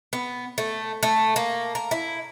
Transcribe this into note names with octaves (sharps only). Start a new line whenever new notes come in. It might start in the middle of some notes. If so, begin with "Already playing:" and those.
B3
A3
A3
A#3
A#4
E4